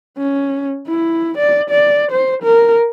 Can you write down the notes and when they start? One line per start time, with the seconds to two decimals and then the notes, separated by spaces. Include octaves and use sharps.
0.18 C#4
0.88 E4
1.38 D5
1.70 D5
2.12 C5
2.43 A#4